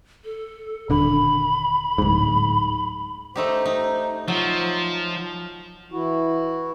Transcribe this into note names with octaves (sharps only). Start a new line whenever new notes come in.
A4
D#1 D3 B5
D1 G#2
A3 D#4 G4 C5
D#4
F3 F#3 F4
E3 E4 F#4